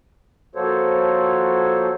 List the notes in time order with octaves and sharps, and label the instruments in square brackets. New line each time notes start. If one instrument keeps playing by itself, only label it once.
[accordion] F3 A#3 F#4 A4 C5 C#5